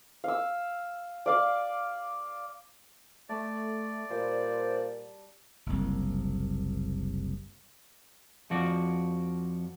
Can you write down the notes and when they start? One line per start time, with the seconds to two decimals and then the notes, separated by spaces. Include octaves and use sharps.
0.24 F5 E6
1.26 D5 F5 D6
3.29 A3 D5 A5
4.10 A#2 G3 C5
5.66 F#1 C2
8.50 F2 F3 F#4 D5